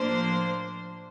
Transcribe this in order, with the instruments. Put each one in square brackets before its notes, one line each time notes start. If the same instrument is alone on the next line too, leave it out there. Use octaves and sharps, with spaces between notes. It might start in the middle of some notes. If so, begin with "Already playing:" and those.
Already playing: [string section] A2 F3 A#3 D4 C5